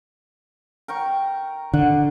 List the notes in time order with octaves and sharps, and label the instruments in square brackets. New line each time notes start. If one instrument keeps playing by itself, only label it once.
[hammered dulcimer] A#4 G5 C#6
[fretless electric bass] D3 [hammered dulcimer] F#5